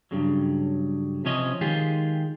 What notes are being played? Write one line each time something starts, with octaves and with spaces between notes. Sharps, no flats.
G2 C#3 F#3
C3 F3 C#4 C#5 D#5
D#3 G#3 F4 G4 G#4